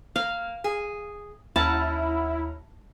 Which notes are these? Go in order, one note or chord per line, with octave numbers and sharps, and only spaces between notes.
A#3 F5
G#4
D#2 C#4 E4 F#5 A5 A#5